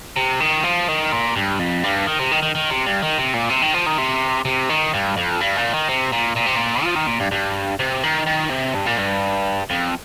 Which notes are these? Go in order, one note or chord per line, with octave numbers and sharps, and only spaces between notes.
C3
D#3
F3
D#3
A#2
G2
F2
G2
D#3
C3
D#3
D#3
D#3
C3
G2
D#3
C3
A#2
C3
D#3
F3
D#3
C3
C3
D#3
G2
F2
G2
A#2
D#3
C3
A#2
A#2
C3
A#2
F3
D#3
A#2
G2
G2
C3
D#3
D#3
C3
G2
A#2
G2
F2